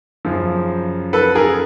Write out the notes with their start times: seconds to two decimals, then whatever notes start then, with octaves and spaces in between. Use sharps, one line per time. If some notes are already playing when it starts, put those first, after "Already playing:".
0.25 F#2 C#3 F3
1.13 A4 B4
1.35 G#4 A#4